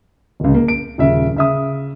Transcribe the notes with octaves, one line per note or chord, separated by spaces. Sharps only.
D1 C#2
A#3
D7
D#1 C#3 E5
C#3 E5 D#6